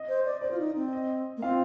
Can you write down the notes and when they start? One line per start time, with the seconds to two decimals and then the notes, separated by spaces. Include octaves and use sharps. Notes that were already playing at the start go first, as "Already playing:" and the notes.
Already playing: D#5
0.08 C5
0.25 D5
0.41 C5 D5
0.51 F4
0.59 D#4
0.75 C4
0.93 D#5
1.37 A#3
1.42 C4 F4 F5